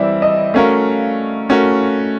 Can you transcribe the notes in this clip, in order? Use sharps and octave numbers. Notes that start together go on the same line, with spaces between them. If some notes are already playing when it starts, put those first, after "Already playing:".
Already playing: E3 G3 C4 E4 D5 E5
D#5
A3 C#4 F#4 A#4 F5
A3 C#4 F#4 A#4